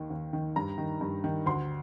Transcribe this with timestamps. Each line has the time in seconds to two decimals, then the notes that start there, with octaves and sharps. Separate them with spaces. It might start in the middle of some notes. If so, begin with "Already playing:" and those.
Already playing: D#2 D#3
0.10 D#2
0.33 D#3
0.56 G2 A#5
0.78 D#3
1.01 G2
1.24 D#3
1.46 D2 C6